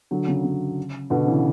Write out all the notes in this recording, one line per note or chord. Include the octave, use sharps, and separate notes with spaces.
D3 F#3
C#3
C#3
B2 D3
C#3 E3